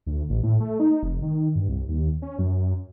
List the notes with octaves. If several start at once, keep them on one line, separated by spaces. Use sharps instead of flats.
D2
A1
A2
A3
D#4
F1
D#3
G2
C2
D#2
C#4
F#2